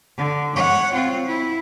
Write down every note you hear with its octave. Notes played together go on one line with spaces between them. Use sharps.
D3
C#5 F#5
C4 F4
E4